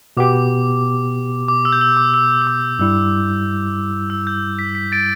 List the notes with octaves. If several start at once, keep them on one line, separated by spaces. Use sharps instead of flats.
B2 B3 G4 D6
D6
E6
G6
E6
D6
E6
E6
D6
G2 G3 E4 E6
E6
G6
B6
B6
A6 D7